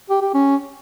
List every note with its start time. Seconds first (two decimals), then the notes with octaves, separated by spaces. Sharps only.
0.10 G4
0.22 G4
0.34 C#4